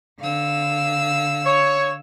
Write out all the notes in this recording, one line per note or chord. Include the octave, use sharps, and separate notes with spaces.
D3 F5 E6
C#5